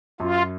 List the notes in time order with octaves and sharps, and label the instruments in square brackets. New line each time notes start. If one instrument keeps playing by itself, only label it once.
[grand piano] F#2 [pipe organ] F4